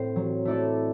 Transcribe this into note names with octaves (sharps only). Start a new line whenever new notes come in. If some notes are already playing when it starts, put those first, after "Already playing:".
Already playing: A2 C4 C5
F#3
A3 E4 A4 D5